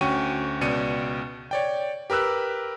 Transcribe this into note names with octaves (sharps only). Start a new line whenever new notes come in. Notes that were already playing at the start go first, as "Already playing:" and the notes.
D2 C#4 F#4 G5 C#6 D#7
C#2 B2 D5 C#7 D#7
C#5 D5 G5
G4 A#4 B4 E6 F#6